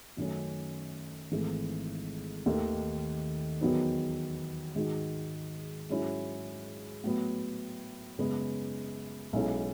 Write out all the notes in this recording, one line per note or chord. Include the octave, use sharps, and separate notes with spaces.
F#2 D#3 F#3 A3 C#4
G#1 G#2 E3 A3
D#2 D#3 A3 D#4
E2 D#3 F#3 B3 D#4
G#2 D#3 G#3 D#4 F#4
G#2 F#3 C#4 E4
A2 F#3 B3
F#2 C#3 G#3 B3
B1 B2 G#3 C#4 E4